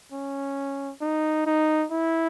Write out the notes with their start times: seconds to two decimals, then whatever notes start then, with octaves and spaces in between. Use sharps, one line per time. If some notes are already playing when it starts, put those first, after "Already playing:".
0.12 C#4
1.01 D#4
1.46 D#4
1.91 E4